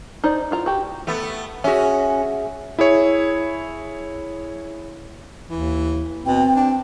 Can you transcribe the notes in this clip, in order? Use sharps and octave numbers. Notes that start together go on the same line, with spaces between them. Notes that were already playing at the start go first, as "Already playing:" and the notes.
D#4 C5 D5
E4 F4 A#5
F#4 G4
A3 B3
C#4 F#4 G#4 E5
E4 G#4 C#5
D#2 E3
B2 C4 G5
D4